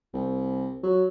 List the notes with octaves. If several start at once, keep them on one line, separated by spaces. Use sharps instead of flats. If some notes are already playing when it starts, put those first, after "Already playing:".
C2
F#3